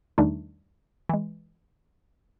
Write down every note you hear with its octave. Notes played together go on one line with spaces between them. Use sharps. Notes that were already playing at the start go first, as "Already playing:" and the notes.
E2 D#3 G3 A3 D4 D#4
E3 G#3